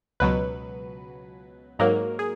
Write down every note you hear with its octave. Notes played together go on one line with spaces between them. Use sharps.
C#2 B2 F#3 B4
G#2 F#3 A#3 A#4
G#4